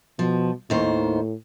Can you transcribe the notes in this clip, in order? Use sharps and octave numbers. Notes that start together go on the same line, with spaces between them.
B2 F3
D#2 A2 D#3 C5